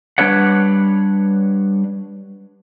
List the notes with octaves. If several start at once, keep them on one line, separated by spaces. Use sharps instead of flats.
G3 D4 B4 C#5 F#5